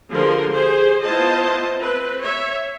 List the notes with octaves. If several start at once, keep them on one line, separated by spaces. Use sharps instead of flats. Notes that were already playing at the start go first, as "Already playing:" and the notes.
D3 F3 G3 G#4 A#4 C6
G4 G#4 C5
B3 E4 F4 C5 D#5 A5
C4 B4
C#5 E5